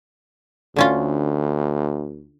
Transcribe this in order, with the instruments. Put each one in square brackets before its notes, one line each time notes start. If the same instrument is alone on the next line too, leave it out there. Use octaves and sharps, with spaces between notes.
[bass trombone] D2 [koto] D3 C#4 F4